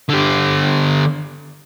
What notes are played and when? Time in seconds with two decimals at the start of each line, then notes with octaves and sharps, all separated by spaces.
0.09 D3 G4